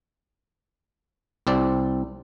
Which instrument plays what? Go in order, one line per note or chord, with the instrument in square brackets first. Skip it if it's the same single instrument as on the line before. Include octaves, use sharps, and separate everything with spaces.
[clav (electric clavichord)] C2 C4 D5